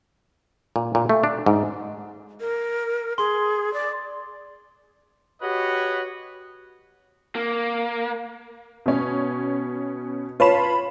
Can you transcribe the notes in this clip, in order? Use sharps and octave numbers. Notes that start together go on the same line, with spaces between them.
A#2
A#2
A3
D4
G#2
A#4
G#4 C6
D5
F#4 G4 B4 C#5 D#5
A#3
B2 C#4
F4 B4 C#5 A5 B5 E7